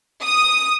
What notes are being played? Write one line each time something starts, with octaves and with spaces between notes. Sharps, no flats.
D#6